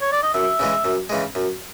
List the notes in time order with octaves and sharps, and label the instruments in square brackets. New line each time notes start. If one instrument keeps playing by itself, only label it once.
[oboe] C#5
D5
D#5
[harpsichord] F#2 [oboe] E5
[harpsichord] C#3 E3 G#3
F#2
C#3 E3 G#3
F#2